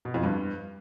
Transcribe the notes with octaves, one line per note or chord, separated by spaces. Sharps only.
B2
F2
G2